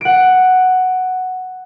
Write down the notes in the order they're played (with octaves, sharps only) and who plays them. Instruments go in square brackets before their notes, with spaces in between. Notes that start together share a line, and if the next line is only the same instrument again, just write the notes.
[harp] F#5 D7